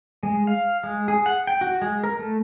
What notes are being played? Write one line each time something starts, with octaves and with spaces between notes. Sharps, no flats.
G#3
F5
G#3
G#4
F#5
G5
F#4
G#3
A#4
A3